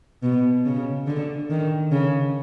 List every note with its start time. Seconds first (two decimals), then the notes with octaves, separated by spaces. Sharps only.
0.23 B2
0.65 C#3
1.07 D3
1.50 D#3
1.92 C#3